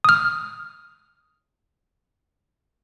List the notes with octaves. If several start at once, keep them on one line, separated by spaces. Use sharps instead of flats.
D#6 F6